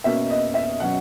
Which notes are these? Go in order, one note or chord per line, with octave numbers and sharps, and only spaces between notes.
B2 A#3 C#4 E5
D#5
E5
B2 F#3 C#4 F#5